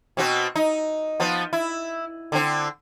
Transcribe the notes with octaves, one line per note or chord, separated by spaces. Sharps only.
B2 C4 F#4
D#4
F3 B3
E4
D3 C4